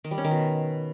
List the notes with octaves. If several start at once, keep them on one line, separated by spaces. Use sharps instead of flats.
D#3
G3
C#4
D#3
B2